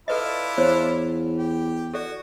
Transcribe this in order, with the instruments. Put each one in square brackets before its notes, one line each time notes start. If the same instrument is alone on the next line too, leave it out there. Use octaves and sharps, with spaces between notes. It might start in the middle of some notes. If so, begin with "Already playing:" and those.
[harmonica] D4 E4 F4 [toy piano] A4 B4 D#5
[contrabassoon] E2 [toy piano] C5 C#5
[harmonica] G4
[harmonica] F#4 [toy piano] A4 D5